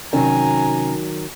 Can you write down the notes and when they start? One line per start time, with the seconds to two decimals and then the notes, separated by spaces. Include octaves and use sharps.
0.13 C3 D#3 F#3 C#4 G#5 A#5